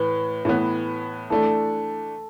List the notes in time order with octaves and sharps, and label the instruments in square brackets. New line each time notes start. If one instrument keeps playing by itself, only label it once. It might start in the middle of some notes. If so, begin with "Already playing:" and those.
Already playing: [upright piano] A2 E3 [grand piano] B4
[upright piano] A2 E3 B3
[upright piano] E3 A3 D4 [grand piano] A4